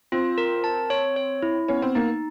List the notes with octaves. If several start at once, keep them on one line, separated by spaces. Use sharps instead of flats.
C4 F4
A#4
A5
C#5
C#5
E4
B3 C#4
C4
A#3 D#4